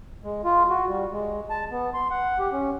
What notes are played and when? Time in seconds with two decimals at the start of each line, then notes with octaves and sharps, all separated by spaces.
0.24 G#3
0.45 F4
0.70 F#4
0.88 G3
1.11 G#3
1.50 A5
1.71 B3
1.94 C6
2.10 F#5
2.39 G4
2.52 C#4